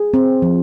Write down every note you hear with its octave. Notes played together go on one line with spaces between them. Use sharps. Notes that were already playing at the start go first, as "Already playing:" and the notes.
Already playing: G#4
C4
F3